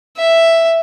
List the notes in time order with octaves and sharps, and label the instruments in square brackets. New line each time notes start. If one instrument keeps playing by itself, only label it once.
[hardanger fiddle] E5